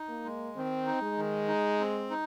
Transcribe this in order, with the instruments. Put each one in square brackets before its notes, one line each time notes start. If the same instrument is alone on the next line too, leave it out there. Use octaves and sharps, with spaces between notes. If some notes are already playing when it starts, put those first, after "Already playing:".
Already playing: [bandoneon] D#4
[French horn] A#3
[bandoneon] G#3
[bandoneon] D#3 [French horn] C4
[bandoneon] D#4
[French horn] G#3
[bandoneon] D#3
D#4
C4
D#4